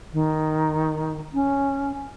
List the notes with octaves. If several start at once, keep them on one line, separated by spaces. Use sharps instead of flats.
D#3
C#4